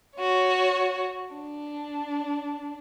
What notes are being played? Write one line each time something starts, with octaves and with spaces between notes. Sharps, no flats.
F#4 C#5
D4